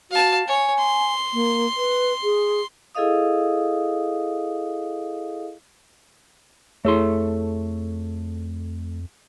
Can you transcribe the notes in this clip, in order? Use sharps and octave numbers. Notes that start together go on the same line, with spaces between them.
F#4 F5 A5
C#5 G#5
C6
A#3
B4
G#4
E4 G#4 A4 D#5 F5 D#6
F2 A3 E4 G#4 A4 C#5 C6